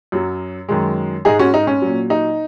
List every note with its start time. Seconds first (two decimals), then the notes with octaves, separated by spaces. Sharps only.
0.12 F#2 F#3
0.69 F#2 D#3 G#3
1.25 G#2 G#3 D#4 G#4
1.39 C#4 F#4
1.54 D#4
1.67 C#4
1.82 A#2 F#3
2.10 D#4